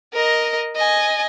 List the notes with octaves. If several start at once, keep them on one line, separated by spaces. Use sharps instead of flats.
A#4 D#5
D#5 G#5